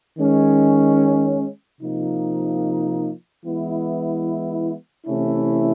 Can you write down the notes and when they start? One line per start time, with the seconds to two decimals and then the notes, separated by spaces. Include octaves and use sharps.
0.18 D#3 G#3 C#4
1.81 C3 F3 A#3 D#4
3.44 E3 G#3 B3 E4
5.07 C3 E3 A3 C#4 E4